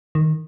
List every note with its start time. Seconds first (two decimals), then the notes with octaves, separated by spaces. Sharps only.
0.15 D#3